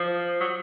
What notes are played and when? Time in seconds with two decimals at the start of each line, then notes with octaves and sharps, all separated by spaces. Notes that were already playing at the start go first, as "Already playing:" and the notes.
Already playing: F3
0.41 F#3